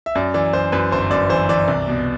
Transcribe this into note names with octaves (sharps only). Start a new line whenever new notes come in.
E5
F#2 D5
E3 D5
F#2 C5
F#2 B4
G1 C5
F#2 D5
E3 C5
E3 D5
C2
B2